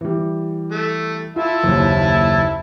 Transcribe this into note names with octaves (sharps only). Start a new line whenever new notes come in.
E3 G3
A3
E4 F4 E5 A5
F#1 D#2